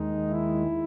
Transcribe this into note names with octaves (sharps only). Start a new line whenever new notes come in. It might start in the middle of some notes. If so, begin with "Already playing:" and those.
Already playing: D#2 D#3 G#3 D#4
E4